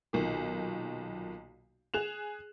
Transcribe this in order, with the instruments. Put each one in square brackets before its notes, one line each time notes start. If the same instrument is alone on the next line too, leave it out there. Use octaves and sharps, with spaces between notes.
[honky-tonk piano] B1 A#2 D#3
G#4 F#6 E7 F7